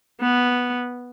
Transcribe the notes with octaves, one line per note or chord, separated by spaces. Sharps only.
B3